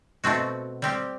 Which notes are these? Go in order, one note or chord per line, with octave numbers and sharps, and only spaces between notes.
B2 A3 C4 F#4
G3 C4 G4